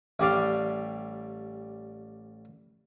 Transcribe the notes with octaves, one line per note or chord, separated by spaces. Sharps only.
A1 G3 D5 F5